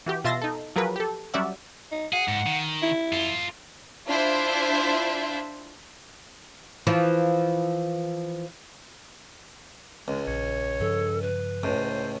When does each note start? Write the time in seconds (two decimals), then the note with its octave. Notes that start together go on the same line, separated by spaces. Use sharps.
0.06 E3 F#4 G4
0.24 B2 F4 E5 C6 A6 A#6
0.42 D#4 A4
0.76 F3 F#3 G#4 A#4 B4
0.96 G4 A4
1.34 F#3 G3 C#4 D5 E5 F#5
1.92 D#4
2.13 G#4 F#5
2.28 G#2
2.46 D#3
2.83 E4
3.13 F4 A4
4.08 D4 E4 F4 C5 E5
6.87 E3 F3
10.08 C#2 G#3
10.27 A#1 C#5
10.81 G2 C#3 F3 A4
11.22 B4
11.63 C#2 A2 C5